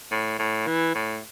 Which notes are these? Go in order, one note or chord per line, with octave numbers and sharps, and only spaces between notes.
A2
A2
E3
A2